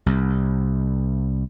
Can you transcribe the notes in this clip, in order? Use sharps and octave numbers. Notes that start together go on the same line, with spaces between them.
C2